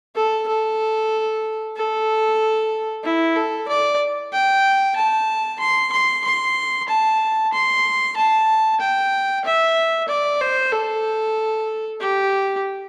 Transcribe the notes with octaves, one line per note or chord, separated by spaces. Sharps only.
A4
A4
A4
E4
A4
D5
G5
A5
C6
C6
C6
A5
C6
A5
G5
E5
D5
C5
A4
G4